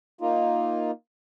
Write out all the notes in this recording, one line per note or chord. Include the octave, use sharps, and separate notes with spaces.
A#3 D#4 F4